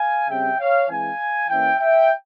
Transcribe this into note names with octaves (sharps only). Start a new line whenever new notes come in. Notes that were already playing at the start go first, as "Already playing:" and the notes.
Already playing: F5 G#5
C#3 G3 C4 E5 G5
C#5 F5
E3 G#3 C4 F5 G#5
E3 A#3 C#4 E5 G5
E5 G5